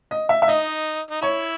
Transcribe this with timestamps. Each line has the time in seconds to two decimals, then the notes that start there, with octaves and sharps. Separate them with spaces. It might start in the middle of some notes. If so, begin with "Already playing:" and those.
0.11 D#5
0.29 E5
0.42 E5
0.48 D#4 D#5
1.10 D#4
1.21 E4 C#5